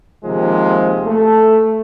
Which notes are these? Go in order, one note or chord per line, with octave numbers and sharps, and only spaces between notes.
D#2 C3 F3 G#3
A3